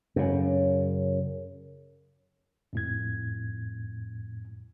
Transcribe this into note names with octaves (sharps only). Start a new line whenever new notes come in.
F#2 C#3
F2 A2 G#6